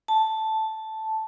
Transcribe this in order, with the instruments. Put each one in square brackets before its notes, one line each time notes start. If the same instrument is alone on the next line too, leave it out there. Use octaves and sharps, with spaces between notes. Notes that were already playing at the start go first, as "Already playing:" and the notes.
[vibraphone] A5